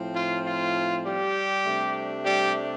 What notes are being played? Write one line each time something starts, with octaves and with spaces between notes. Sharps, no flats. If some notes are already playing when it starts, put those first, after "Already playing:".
Already playing: A2 F3 C4
F4
F4
G3 G4
C3 A3 D4
G3 G4